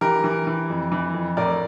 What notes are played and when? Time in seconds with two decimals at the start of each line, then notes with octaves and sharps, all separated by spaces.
0.01 E3 G4 A#4
0.24 E3
0.47 E3
0.70 F2
0.92 E3
1.14 F2
1.37 A2 A#4 D5